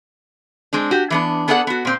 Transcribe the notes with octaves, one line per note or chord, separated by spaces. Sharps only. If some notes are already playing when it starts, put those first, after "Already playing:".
G#3 C4 D4
F#4 G4
E3 B3 D4
B3 G#4 A4 D5 E5 F#5
B3 F#4
A#2 C4